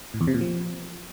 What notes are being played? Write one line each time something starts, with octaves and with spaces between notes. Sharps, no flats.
A2
E2
C3
A#2
F3